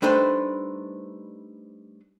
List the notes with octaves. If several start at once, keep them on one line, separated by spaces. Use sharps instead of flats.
G3 A3 D4 D#4 B4 C5